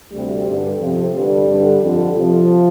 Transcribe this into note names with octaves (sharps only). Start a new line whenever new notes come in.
D2 C3 G3
G2 D3
F2 C3 F3
G2 D3 G3
G2 D3
F2 D3
F2 C3 F3